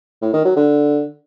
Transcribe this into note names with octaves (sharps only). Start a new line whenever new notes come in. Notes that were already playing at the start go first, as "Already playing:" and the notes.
A2
D#3
F#3
D3